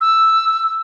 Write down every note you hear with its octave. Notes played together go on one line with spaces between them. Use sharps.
E6